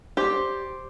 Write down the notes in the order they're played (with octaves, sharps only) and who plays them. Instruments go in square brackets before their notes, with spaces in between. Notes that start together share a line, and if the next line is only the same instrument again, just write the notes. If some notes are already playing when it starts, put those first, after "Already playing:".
[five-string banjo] G4 [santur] C5 D5